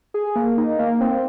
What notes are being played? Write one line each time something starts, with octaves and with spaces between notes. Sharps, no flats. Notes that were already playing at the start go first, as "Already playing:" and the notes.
G#4
A#3
D#4
A#3
C4